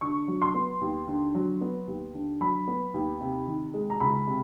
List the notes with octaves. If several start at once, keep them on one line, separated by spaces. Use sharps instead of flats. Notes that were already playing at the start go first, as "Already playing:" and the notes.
D3 C#6
F#3
C6
B3
D#2
D3
F#3
B3
D#2
D3
F#3 B5
B3
D#2
C3
D#3
G#3
A#5
C#2 B5
C3